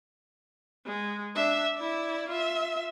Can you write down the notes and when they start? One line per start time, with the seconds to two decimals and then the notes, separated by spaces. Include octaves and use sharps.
0.86 G#3
1.36 D4 E5
1.76 E4 D5
2.29 F4 E5